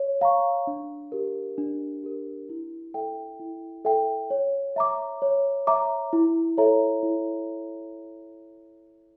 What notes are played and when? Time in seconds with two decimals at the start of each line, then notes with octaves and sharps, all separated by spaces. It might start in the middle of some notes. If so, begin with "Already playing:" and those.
Already playing: C#5
0.21 F5 A#5 C#6
0.67 D4
1.12 G4 A#4
1.58 D4
2.04 G4 A#4
2.49 E4
2.94 A4 E5 G5
3.40 E4
3.85 A4 E5 G5
4.30 C#5
4.76 E5 A#5 D6
5.22 C#5
5.67 E5 A#5 D6
6.13 E4
6.58 A4 C#5 E5 A#5
7.03 E4